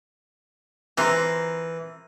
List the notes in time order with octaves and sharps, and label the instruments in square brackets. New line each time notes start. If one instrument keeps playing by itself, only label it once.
[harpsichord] E3 [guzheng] A#4 C5